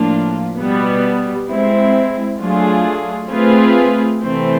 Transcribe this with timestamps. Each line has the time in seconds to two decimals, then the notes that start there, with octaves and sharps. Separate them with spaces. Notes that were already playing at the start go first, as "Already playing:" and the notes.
Already playing: A2 F3 A#3 D4 F4
0.59 B2 G3 B3
1.49 G#3 C4 E4
2.40 F#3 A3 D4 F4 G#4
3.29 A3 C4 F4 G#4 B4
4.20 C3 E3 A3 C4